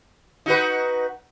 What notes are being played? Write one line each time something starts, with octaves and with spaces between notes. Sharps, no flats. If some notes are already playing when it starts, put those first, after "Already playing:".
D#4 F#4 B4